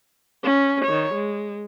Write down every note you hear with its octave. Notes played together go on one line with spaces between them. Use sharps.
C#4
D#3 C#5
G#3